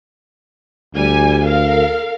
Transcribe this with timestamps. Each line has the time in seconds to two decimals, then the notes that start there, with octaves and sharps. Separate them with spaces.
0.95 D2 G3 G#5
1.44 A4 A#4 F5